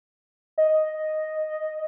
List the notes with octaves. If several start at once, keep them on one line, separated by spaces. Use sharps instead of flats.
D#5